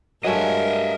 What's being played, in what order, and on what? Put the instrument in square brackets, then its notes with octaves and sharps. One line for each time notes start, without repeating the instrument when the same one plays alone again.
[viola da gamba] G2 A#4 [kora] F#3 G#3 A3 [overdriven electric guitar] D#5 E5